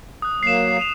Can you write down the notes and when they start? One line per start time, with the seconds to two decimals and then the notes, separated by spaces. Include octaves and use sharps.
0.22 D#6 F#6
0.43 F#3 A#3 C7 E7
0.77 C7 D#7 F7